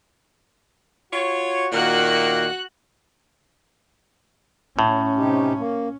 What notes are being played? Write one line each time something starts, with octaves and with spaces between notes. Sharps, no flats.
F4 F#4 C#5
A#2 D#3 A#3 F#4 F#6
A2 C#4
C3 D#4 G4
A#3